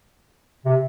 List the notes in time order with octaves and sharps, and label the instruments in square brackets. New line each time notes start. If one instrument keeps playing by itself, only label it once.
[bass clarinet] C3